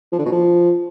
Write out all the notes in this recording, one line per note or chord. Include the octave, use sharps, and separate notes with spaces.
F3
D3
B2
F3